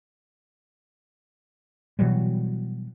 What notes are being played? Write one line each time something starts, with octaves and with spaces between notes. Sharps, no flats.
B2 E3 F#3 G3